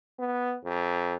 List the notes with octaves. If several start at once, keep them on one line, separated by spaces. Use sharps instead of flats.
B3
F2